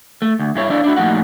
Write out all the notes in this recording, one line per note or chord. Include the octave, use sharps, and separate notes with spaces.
A3
D2
G2 E4 C#5
C#4 D4 E4 D5 F5
D4 E4 F#4
A#2 F3 A3 D#4 F#4 F#5